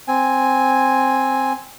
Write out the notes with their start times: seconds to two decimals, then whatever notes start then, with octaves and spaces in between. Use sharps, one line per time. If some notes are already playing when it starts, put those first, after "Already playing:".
0.08 C4 G#5